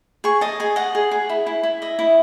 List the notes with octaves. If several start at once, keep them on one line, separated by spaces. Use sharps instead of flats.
G#4 C#6
D#5 A5
G#4 G#5
D#5 F#5
G#4
G#4
E4
E4
E4
D#5 E5
E4